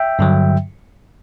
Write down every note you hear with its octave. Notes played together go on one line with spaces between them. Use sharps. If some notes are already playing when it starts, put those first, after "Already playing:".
Already playing: E5 G5
G2 D3 F#3